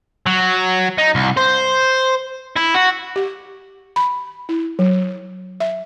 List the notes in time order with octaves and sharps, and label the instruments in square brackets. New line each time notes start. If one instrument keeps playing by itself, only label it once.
[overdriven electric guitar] F#3
D#4
C2
C5
E4
F#4
[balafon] G4
B5
E4
F#3
E5